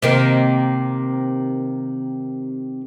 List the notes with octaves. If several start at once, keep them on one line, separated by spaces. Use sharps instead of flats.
C3 D#3 A#3